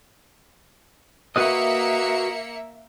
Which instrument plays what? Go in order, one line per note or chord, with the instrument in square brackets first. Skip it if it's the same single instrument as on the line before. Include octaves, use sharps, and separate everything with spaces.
[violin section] A#3 E5 C#7 [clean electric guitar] F#4 B4 D#5